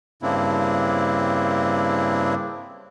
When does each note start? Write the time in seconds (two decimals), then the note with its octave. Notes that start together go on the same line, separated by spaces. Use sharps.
0.22 G2 C#3 A#3 C4 D4 E4